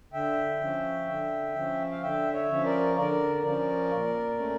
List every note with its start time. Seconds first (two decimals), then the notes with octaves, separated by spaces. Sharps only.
0.13 D3 E5 G5
0.60 F3 C#4
1.08 D3
1.55 F3 C#4
1.91 F5
2.02 D3 E5 G5
2.33 C#5 E5
2.50 F3 C#4
2.65 A#4 D5
2.96 D3 A#4 D5
3.44 F3 C#4 A#4 D5
3.91 A#2
4.38 A3 C#4